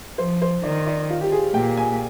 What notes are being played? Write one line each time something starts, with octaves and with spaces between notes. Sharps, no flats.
F3 C5
C5
D#3 D5
D5
F4
G4
G#4
A#2 G5
G#5